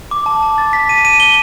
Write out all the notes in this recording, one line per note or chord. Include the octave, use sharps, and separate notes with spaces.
D6
A5
A5
A6
B6
D#7
D#7
G7